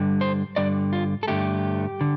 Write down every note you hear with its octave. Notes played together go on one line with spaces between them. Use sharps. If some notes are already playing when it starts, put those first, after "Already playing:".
Already playing: G2 D3 G3
C5
G2 D3 G3 D5
F4
A4
G2 D3 A3 G4
D3